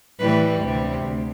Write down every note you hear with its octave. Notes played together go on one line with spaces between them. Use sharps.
A2 E3 G3 B4
D2 C3 G3
D2